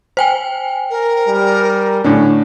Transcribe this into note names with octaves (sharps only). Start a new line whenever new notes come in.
C5 G5 G#5
A#4
G3
A2 D3 C#4